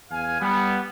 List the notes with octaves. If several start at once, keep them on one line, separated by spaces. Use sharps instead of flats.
E2 F5 G#5
G3 B3